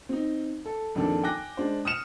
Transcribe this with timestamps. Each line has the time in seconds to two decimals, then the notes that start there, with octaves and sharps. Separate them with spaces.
0.09 C4 D#4
0.66 A4
0.95 A#1 F2 D#3 D4 A4
1.24 G5 G#5 D6 F#6 A#6
1.57 G#3 D4 C5
1.85 D#6 F6 C#7 E7 F7